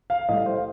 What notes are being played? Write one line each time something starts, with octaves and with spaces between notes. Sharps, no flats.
F5
A2 G3 D#5
C5
F5